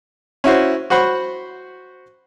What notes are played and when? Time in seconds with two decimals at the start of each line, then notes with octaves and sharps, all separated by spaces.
0.44 C#4 E4 F#4 C5
0.90 F#4 C5 F#5 B5 C#6